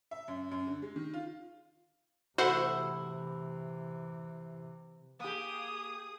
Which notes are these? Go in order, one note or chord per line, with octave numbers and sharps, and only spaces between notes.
E5
F#2
F#2
D3
G#3
D#3
F4
C3 E3 A3 E4 F#4 C5 F#5
A#3 G4 G#4 D#6